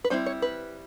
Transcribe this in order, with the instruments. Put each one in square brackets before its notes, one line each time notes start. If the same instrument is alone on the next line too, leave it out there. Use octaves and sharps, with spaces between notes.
[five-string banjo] B4
G3 C4 E4 C5
C#5
B4